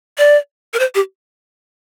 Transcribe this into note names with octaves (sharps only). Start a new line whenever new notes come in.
D5
A#4
C5
G4